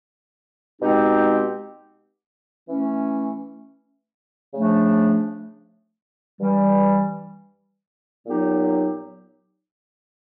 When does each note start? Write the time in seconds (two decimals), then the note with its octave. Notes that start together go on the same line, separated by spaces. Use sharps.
0.81 B2 G#3 C4 D#4 G4
2.67 E3 A3 C#4
4.53 C#3 F3 A3 D4
6.39 G2 E3 G3
8.26 A#2 F#3 B3 D#4 G4